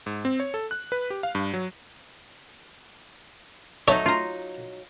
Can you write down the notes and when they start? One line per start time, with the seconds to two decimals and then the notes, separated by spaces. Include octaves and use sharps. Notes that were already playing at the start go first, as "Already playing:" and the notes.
0.06 G#2
0.25 C4
0.40 C#5
0.54 A4
0.71 F#6
0.92 B4
1.10 G4
1.23 F5
1.35 G2
1.54 F#3
3.88 F#3 A3 D#4 C#5
4.06 F4 A#5